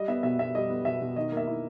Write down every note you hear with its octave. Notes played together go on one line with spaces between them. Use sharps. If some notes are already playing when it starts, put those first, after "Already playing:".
Already playing: G3 D#5
B3 E5
B2 E5
B2 E5
G3 D#5
B3
B2 E5
B2
D#3 D#5
A#3 E5
E4